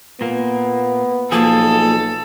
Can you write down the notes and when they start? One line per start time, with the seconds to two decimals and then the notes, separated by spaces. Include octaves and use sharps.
0.21 A#2 A#3 B3
1.32 B1 F3 A#3 G#4 A4